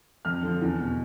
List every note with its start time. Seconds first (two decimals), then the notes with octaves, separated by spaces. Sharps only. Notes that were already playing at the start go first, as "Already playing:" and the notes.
0.25 F2 F6
0.43 D3 F3
0.62 E2
0.80 B2